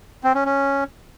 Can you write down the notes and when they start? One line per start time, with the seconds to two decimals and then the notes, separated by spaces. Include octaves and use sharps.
0.24 C4
0.35 C#4
0.45 C#4